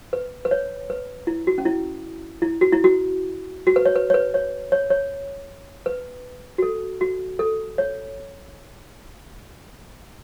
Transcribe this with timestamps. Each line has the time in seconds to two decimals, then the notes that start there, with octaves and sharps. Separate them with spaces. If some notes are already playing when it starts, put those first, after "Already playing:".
0.13 B4
0.45 B4
0.51 C#5
0.90 B4
1.27 E4
1.47 F#4
1.58 C#4
1.65 E4
2.42 E4
2.61 F#4
2.73 E4
2.84 F#4
3.67 F#4
3.76 B4
3.85 C#5
3.95 B4
4.10 C#5
4.14 B4
4.34 C#5
4.72 C#5
4.90 C#5
5.86 B4
6.58 F#4
6.62 A4
7.01 F#4
7.39 A4
7.78 C#5